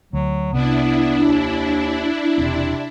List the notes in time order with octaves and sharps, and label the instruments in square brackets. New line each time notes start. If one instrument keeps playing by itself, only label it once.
[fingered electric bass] D2 [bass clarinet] F#3
[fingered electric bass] C2 C3 [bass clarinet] B3 [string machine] D4 E4
[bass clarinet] D#2
[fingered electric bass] E1 C4 [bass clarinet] C3